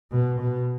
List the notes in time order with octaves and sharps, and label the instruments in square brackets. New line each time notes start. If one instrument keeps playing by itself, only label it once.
[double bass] B2
B2